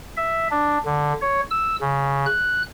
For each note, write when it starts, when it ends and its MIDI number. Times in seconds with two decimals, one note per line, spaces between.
0.17 0.48 76
0.51 0.78 62
0.86 1.13 50
1.22 1.41 73
1.51 1.76 88
1.81 2.26 49
2.26 2.63 90